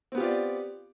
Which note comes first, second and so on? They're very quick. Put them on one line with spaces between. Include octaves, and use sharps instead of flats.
C4 B3 G4 F4 D5